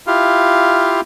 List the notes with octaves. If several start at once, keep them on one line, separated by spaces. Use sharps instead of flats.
E4 F4 G4 F5